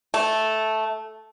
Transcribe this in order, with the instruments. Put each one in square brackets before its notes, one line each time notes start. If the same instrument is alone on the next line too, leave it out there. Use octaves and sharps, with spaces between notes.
[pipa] A3